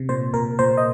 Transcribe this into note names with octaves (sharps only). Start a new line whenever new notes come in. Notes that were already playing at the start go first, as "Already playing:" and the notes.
Already playing: C3
A#2 C5
A#2 A#4
A#2 C5
D#5